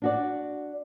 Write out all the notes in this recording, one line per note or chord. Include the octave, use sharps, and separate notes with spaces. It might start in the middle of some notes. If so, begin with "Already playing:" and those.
D4 F#4 D5